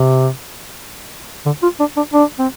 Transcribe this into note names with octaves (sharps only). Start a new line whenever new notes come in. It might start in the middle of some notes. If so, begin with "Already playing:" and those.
Already playing: C3
D3
F4
D4
D4
D4
C4